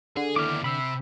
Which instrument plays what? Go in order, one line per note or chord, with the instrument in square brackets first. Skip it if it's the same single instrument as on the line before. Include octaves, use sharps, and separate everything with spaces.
[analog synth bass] D3 [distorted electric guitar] G#4
[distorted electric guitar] D#2 E4 [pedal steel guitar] D6 F6
[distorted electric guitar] C3 [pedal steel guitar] B5 E6